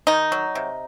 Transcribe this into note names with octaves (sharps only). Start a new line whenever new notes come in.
D#3 D#4
F#3
C3